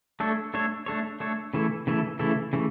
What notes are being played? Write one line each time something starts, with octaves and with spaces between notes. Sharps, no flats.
A3 D4 A4 C#5
A3 D4 A4 C#5
A3 D4 A4 C#5
A3 D4 A4 C#5
C#3 E3 A3 E4 A4
C#3 E3 A3 E4 A4
C#3 E3 A3 E4 A4
C#3 E3 A3